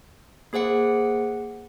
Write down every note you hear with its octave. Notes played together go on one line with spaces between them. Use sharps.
A#3 G#4 C5 F#5 C#7